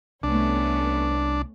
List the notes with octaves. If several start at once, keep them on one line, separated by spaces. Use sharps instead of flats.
C2 A3 B3 C#4 D4